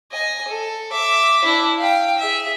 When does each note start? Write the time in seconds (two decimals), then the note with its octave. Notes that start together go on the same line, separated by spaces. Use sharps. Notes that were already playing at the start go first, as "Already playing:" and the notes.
0.12 D#5 G#5
0.48 A4
0.92 E5 D6
1.45 D4 E4
1.77 F5 G5
2.18 G#4 E5